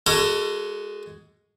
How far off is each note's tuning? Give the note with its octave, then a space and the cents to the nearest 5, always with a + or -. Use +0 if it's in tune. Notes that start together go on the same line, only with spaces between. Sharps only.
G#3 +0 F#4 +20 A4 +35